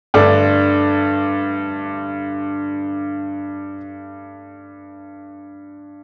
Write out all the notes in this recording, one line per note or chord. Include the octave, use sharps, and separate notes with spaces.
G2 D3 A3 D4